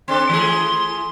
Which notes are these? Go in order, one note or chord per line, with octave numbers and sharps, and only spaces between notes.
C4 D4 A4 C6
E3 A3 G#4